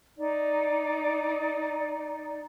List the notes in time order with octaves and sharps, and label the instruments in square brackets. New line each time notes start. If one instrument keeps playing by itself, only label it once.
[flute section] D#4 D5